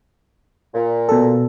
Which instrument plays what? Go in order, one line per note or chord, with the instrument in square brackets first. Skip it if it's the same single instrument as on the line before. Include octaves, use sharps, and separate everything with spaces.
[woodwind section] A#2
[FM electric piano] B2 A4